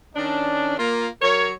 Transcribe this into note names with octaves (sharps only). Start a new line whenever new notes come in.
D#3 C#4 D4
A#3 F4
F#3 A#4 C#5